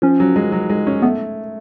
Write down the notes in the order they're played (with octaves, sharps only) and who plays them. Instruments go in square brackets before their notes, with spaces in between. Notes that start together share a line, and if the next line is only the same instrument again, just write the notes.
[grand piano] F3 [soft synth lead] C#4
[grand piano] F#3
G#3
F#3
G#3
C#4
[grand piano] A3 [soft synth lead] B3